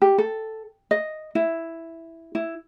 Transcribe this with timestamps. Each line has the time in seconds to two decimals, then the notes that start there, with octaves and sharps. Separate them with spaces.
0.02 G4
0.18 A4
0.91 D#5
1.35 E4
2.35 E4